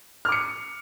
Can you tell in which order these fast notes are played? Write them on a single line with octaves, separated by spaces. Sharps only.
F6 D6 C#7